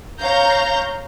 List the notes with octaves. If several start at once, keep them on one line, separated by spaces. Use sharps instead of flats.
C#5 F5 A#5 G6